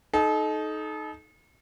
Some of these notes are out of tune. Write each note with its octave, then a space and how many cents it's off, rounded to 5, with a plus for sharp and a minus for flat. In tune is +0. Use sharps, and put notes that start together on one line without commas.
D#4 +0 A4 -35